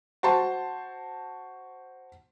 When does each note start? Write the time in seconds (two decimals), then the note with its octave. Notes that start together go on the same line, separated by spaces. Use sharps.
0.23 F#4 C5 A5 C6